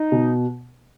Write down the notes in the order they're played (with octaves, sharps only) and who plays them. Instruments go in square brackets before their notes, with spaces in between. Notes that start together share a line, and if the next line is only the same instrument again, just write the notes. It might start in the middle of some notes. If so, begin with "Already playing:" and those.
Already playing: [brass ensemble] D#4
[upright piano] B2